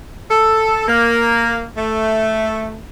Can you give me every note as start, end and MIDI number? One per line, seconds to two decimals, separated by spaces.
0.31 0.84 69
0.88 1.66 58
1.78 2.81 57